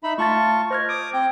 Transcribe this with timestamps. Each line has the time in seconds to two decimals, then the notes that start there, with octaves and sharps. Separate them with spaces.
0.03 D#4 E5 B5
0.18 A3 F4 A5 C#6 A6
0.71 C5 D#5 F6 G#6
0.89 D6 D#6 D7
1.13 C4 G5